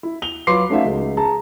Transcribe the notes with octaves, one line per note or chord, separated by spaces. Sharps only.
E4
F7 G7
F#3 F4 B4 C6 D6 C7
A3 C#4 D#4 F#4 E5 F5
C#2
G#4 A5 A#5